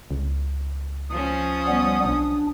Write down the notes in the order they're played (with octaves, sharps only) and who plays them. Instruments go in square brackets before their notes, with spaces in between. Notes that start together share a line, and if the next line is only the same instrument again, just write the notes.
[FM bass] C#2
[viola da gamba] F3 C#4 [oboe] D#6
[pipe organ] G3 B3
[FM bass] B1 [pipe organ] D4